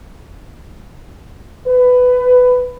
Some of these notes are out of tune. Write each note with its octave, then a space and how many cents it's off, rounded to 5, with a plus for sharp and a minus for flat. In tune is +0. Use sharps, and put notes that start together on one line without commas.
B4 +15